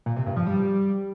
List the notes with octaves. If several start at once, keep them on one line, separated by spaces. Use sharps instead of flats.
A#2
C3
G2
F3
G3